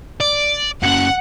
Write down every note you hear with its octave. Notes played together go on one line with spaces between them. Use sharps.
D5
F#2 C#3 F#5